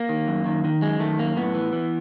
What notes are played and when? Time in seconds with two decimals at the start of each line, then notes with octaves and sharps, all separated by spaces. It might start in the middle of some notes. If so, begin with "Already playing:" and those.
Already playing: A#3
0.09 D#3
0.28 F#2
0.46 D#3
0.64 D#3
0.82 F#2 G#3
1.00 D#3 A3
1.19 F#2 A#3
1.36 A2 B3
1.54 E3
1.72 E3